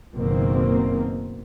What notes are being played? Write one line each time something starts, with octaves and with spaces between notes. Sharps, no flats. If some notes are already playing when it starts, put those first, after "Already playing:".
F#1 B2 D#3 A#3 C4